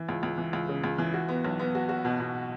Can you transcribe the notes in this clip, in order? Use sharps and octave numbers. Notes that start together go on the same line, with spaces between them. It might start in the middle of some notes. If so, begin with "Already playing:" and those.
Already playing: E3
C#2
C#2
E3
C#2
C#3
C#2
E3
F#4
B3
B1
B3
F#4
F#4
B2
B2